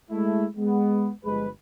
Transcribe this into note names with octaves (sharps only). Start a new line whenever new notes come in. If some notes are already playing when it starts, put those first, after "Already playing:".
G#3 A3 E4
G#3 B3
G1 F3 G#3 G#4 B4